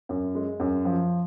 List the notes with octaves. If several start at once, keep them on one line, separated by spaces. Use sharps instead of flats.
F#2
G#3
F#2
F3